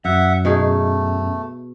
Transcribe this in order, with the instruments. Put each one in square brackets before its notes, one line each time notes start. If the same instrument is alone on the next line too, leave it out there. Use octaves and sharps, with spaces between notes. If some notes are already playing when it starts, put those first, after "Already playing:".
[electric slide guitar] F#2 [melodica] E5 F#5
[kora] B2 D#4 G#4 [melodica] A3